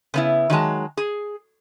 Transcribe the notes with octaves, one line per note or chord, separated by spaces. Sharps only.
C#3 B3 E4
D#3 F#3 G#3 A5
G#4